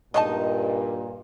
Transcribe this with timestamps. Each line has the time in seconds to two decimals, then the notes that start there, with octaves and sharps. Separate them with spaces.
0.14 G2 A#2 G#3 D#4 C#5 D#5 A5